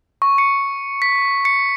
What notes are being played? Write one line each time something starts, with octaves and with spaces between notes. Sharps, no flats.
C#6
C#7
B6
C#7